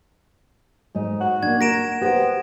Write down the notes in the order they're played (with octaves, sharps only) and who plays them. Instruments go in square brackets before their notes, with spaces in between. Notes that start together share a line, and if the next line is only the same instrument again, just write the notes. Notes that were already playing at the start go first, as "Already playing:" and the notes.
[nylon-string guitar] G#2 A3 D#5
[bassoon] F#4
[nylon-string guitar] A#3 D4 [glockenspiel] G#6
[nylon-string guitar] A#4 [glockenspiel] A#6 D7 E7
[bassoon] B3 [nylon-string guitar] G4 C5